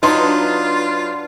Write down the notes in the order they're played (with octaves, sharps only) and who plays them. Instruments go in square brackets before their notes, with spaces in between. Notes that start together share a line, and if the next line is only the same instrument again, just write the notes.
[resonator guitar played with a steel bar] F#3 D#4 [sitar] D4 [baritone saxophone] F4 [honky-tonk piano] B4 C6